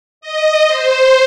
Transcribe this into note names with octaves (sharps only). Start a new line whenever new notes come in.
D#5
C5